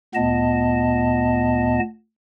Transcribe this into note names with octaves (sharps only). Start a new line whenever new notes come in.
D2 A#2 B3 D#5 A5